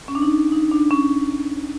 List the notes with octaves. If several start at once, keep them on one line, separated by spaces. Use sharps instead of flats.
C#4
D4
D#4
D#4
D4
C#4